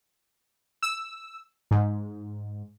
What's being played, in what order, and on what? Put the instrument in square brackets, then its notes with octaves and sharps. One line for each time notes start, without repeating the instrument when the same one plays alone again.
[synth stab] E6
G#2